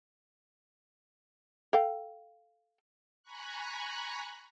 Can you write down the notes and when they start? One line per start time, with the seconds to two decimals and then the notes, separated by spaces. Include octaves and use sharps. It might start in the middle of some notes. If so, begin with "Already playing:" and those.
1.73 A4 F5 G5
3.23 G#5 A#5 B5 C#6 F#6